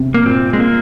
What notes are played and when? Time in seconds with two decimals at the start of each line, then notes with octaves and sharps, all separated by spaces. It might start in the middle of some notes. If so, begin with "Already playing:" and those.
Already playing: C3
0.14 A#3
0.25 A#2 C4
0.53 G#3
0.60 A#3